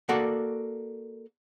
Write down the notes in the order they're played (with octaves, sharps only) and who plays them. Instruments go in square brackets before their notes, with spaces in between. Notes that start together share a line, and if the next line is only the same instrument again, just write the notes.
[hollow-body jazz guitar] A#3 F#4 A4 D5 F#5